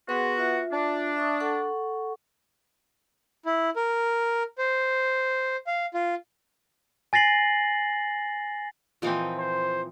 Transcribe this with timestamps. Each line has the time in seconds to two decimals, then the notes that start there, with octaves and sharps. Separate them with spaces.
0.09 B3 F#4 G#4 B4 C6
0.38 F4 E5
0.73 D4
1.16 E5 C#6 D#6
1.40 A4 F#5 C#6
3.46 E4
3.76 A#4
4.58 C5
5.67 F5
5.94 F4
7.13 G#5 A6 A#6 C7 F#7
9.02 A#2 E3 F3 C4 A#4 D#5
9.38 C5